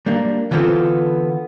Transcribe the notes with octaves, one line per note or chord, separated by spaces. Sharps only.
G3 A#3 D4
D3 E3 B3 C4 F4 A4